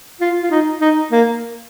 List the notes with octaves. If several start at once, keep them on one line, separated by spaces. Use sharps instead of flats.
F4
F4
D#4
D#4
A#3